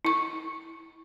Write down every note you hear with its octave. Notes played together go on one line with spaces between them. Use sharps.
E4 C#6